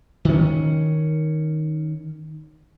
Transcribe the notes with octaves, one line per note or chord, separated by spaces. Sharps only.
D#3 C#4